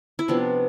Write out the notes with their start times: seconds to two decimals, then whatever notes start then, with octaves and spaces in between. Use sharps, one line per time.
0.19 E4
0.28 C3 F3 B3 D4